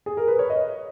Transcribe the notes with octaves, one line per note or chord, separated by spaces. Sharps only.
G#4
A#4
B4
C#5
D#5